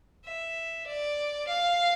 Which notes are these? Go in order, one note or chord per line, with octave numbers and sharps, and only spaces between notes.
E5
D5
F5